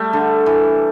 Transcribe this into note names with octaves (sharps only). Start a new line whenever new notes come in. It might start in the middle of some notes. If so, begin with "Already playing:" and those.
Already playing: G3 A3
D3
E3